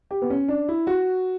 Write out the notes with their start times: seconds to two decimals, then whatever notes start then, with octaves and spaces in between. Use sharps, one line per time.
0.11 G4
0.22 B3
0.30 C#4
0.48 D4
0.69 E4
0.87 F#4